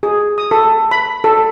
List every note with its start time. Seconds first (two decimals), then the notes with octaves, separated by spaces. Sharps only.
0.03 G#4
0.38 D#6
0.51 A4
0.91 B5
1.24 A4